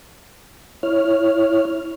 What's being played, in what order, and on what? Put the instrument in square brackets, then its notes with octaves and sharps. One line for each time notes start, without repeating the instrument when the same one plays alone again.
[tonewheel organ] E4 C#5 F6